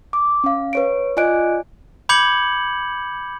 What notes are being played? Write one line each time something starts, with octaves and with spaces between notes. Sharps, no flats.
D6
C#4 F5
B4 C#5 D7
F4 D5 D#5 G#5 F#6 D7
B5 D6 G6 G#6 C#7 F#7